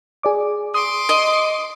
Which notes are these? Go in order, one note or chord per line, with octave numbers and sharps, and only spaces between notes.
G#4 D5 D6
C6 D6 D#6
D#5